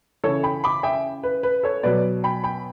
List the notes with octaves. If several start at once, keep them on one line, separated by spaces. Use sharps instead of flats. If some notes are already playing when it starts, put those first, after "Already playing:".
C#3 E3 A4 C#5
G5 B5
B5 D6
E5 G5
B4
B4
A4 C#5
B2 F#3 B4 D5
G5 B5
G5 B5